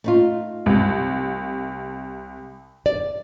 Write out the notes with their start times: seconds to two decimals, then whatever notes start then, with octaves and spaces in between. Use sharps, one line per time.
0.04 A3 D#4 F4
0.66 C2
2.86 D5